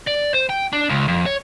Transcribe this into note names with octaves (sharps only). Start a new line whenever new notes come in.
D5
C5
G5
D4
C#2
F2
C#5